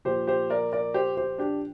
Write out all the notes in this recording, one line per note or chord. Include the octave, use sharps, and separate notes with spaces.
A#2 F3 G4 C5
G4 C5
A#4 D5
A#4 D5
G4 C5
G4 C5
D4 G4